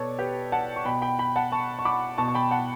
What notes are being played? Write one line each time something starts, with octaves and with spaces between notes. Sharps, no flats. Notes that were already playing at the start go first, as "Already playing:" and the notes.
Already playing: B2 A4 B4 C#5 D5
G4 B4
F#5 A5
C#6
B2 G5 B5
G5 B5
G5 B5
F#5 A5
A5 C#6
C#6
B5 D6
B2 A5 C#6
C#6
G5 B5
F#5 A5